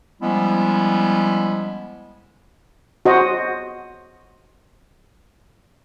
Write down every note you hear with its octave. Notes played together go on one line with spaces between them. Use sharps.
F3 G3 G#3 B3 C#4 E4
F#4 C5 D#5